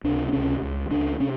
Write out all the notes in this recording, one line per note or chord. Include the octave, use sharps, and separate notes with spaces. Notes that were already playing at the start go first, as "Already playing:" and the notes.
C#2 C3 D4
C4
C#2 C3 C#4
C#2 C#3
C#2 C#3 D4
C3 C#4